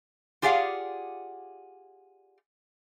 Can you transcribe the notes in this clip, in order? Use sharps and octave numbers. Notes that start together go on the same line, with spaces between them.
F4 G4 G#4 D5 F5 F#5